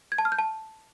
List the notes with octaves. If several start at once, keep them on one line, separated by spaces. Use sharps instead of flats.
G#6
A5
F6
G6
A5